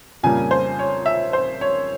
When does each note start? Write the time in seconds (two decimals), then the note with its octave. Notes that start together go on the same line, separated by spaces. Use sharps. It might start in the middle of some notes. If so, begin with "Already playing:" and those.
0.23 F2 C#3 G3 A#3 G#5
0.51 C5
0.79 C#5
1.06 E5
1.33 C5
1.61 C#5